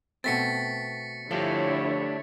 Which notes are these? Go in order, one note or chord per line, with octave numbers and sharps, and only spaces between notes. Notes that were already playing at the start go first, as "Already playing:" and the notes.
B2 A3 C4 A6 B6 C#7
D3 F3 A3 D4 E4 G4 C#5